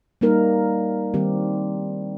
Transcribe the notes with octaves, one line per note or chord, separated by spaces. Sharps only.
G3 A#3 D#4 A#4
D#3 G3 C4 G4